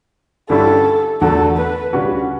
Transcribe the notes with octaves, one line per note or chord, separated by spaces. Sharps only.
G2 D3 G3 C#4 E4 A4
E2 D3 A3 D4 F#4 A4
B4
D2 C#3 G3 C#4 F#4